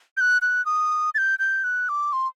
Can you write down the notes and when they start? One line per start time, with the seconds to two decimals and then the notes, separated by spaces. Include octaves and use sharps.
0.17 G6
0.21 F#6
0.42 F#6
0.66 D#6
1.15 A6
1.18 G6
1.39 G6
1.64 F#6
1.89 D6
2.13 C6